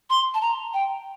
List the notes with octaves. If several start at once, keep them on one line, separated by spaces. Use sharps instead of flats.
C6
A5
A#5
G5